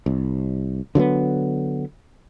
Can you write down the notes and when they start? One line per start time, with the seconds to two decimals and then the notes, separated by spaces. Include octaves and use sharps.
0.06 C2
0.95 D3 F#3 A3 B3